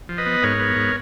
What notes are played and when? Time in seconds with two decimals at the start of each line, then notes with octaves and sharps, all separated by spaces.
0.09 F3
0.18 B4 D#5
0.26 B3
0.43 G#2 A#4 C#5
0.60 B3
0.76 G#2